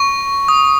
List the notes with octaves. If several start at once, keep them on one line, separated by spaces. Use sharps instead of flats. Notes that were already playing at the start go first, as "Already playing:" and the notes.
Already playing: C#6
D#6